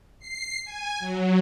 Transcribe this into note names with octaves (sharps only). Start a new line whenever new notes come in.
C7
G#5
F#3